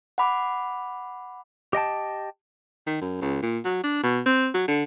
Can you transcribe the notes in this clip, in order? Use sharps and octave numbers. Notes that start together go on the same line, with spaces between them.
F#5 G#5 B5 D6
G4 D#5 G5 A5
D#3
F#2
C#2
A#2
F#3
D4
B2
C4
F#3
D3